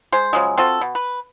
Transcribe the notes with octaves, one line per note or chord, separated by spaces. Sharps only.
G#3 C5
C#3 F3 F#3 G#3
C4 F4 F#4 A4
B2
B4